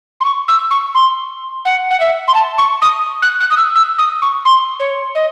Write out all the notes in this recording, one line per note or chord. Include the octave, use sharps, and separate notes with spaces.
C6
C#6
E6
C#6
C6
F#5
F#5
E5
C6
A5
C#6
D#6
F#6
F#6
D#6
E6
E6
D#6
C#6
C6
C#5
D#5